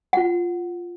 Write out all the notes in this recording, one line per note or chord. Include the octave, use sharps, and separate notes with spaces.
F4 F#5